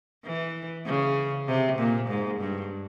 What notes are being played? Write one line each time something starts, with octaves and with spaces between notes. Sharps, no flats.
E3
C#3
C3
A#2
G#2
G2